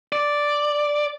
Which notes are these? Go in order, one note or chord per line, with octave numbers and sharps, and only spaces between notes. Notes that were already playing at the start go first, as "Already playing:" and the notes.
D5